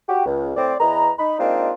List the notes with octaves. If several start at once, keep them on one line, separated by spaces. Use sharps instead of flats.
F#4 G4
C#2
A2 C4 D5
E2 E3 B4 D#5 A#5
D#4 B5
G#3 A#3 C4 D4 D#4 F4